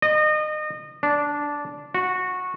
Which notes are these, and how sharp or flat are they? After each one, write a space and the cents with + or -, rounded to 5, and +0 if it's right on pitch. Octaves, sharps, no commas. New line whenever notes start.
D#5 -30
D4 -10
F#4 -15